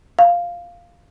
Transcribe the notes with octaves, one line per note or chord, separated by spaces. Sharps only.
F5